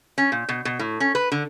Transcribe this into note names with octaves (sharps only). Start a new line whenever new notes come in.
C#4
A#2
B2
B2
A2
C#4
B4
D3